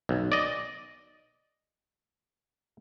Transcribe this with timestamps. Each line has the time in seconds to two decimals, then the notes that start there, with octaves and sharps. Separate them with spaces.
0.09 B1
0.32 D5 D#5